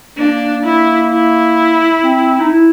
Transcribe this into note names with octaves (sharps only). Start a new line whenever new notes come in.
A#3 D4
E4
E4
C4
D#4
E4